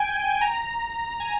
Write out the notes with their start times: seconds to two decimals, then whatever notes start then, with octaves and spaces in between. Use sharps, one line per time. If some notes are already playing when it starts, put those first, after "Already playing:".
Already playing: G5 G#5
0.41 A#5
1.20 G#5